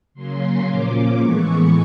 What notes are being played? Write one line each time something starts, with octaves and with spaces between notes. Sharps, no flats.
C#3 F#3 A#3 C#4 C6
A#2 F3 A#3 C#4 D6
A2 E3 G#3 B3 C#6